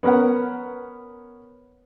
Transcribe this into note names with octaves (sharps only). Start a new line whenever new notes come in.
B3 C#4 A#4 B4 F#5